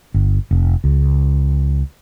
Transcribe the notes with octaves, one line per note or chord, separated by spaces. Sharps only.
G1
F1
C#2